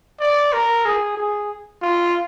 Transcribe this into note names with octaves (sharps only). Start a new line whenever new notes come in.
D5
A#4
G#4
G#4
F4